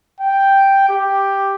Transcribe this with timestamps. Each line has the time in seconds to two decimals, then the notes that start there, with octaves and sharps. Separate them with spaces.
0.21 G5
0.89 G4